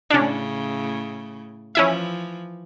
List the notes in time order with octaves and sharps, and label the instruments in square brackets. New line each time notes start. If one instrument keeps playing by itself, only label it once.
[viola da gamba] A2 C#3 [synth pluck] C#4 D4
[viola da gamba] E3 F3 [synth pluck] C#4 E4 E5